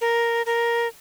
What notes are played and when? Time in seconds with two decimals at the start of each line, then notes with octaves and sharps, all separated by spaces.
0.01 A#4
0.46 A#4